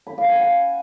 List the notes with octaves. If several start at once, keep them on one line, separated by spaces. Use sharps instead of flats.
B5
F5
G#5
F#5